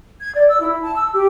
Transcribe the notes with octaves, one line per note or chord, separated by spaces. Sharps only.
G#6
D5
E6
E4
A5
E6
G4